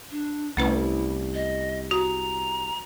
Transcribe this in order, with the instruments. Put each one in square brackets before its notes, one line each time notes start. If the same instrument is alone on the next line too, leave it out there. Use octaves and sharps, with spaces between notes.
[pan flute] D4
[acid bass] C2 [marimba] A3 C#4 B4 [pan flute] E4
[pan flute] D#5
[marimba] F#4 [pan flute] A#5